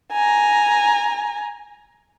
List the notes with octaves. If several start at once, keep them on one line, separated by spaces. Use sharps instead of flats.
G#5 A#5